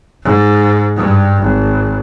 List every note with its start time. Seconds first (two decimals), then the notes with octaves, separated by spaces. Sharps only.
0.23 G#2
0.96 G2
1.42 G#1